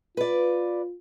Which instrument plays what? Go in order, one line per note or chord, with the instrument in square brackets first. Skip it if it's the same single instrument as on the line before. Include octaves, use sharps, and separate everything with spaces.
[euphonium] F4 [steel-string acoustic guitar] B4 D5